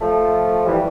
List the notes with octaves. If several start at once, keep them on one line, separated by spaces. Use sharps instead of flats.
F3 A3
E3 G3